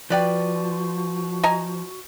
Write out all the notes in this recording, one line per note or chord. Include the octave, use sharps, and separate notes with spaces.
F3 F#4 B4 D5 G5
D#5 G#5 A#5